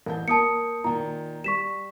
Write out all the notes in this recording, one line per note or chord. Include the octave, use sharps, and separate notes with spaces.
A1 A5 G6
A#3 A5 D#6 C#7
A#2 D#3 A#5
G3 C#6 B6 E7